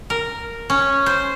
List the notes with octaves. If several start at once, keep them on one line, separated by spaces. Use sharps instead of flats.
A#4
C#4
C5